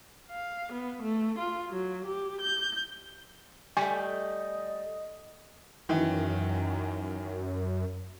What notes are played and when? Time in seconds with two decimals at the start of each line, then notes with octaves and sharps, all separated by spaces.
0.30 F5
0.73 B3
1.03 A3
1.39 F4
1.70 F#3
2.07 G4
2.42 G6
3.77 G3 A3 D#5 G#5
5.89 F#2 D#3 E3